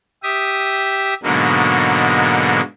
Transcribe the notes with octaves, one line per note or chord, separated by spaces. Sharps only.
G4 E5 D#6
G#2 B2 D3 F#3 G#3 A#3